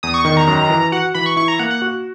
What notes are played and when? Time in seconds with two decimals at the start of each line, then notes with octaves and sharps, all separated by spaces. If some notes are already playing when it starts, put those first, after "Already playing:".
0.03 E2 D#6
0.14 C#6
0.25 D#3 C#6
0.37 A#5
0.47 F#2
0.70 E3
0.92 F#4 F#5
1.15 E3 B5
1.26 C#6
1.37 E4 C#6
1.48 A#5
1.59 A#3 F#5
1.71 F#5
1.82 F#4